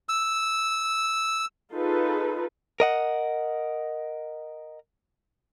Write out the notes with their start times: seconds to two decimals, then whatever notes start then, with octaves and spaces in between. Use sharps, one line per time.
0.09 E6
1.72 D#4 F4 G#4 A4 B4
2.80 A#4 D#5 F#5